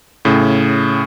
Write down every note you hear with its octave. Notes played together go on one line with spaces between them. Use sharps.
A2 C#3